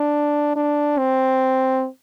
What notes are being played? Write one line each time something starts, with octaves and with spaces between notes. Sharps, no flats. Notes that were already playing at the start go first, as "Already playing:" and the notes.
Already playing: D4
D4
C4